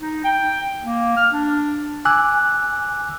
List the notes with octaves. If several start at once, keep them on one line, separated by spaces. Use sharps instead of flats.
D#4
G5
A#3
F6
D4
G#5 D6 E6 F#6